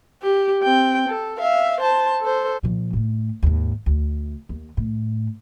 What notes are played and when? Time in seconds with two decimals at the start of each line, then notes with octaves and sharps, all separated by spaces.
0.22 G4
0.63 C4 G5
1.09 A4
1.39 E5 F5
1.80 C5 A5
2.21 A4 C5
2.63 A#2 F3
2.93 A2 A3
3.43 D#2 G#2
3.86 D2
4.49 D#2
4.77 A2